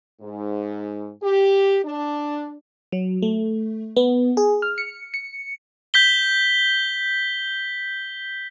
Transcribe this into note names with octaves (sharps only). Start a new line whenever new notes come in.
G#2
G4
D4
F#3
A3
B3
G#4
F6
C#7
C#7
G6 B6 G7